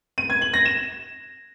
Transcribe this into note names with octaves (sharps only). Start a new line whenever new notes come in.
D#7
G#6
F#7
A#6
E7